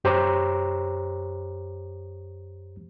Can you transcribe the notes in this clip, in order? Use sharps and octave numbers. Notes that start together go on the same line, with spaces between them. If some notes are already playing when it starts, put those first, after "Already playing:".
F#2 G4 C5 C#5 A#5 D6